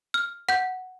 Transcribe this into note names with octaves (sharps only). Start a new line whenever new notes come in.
F6
F#5 G6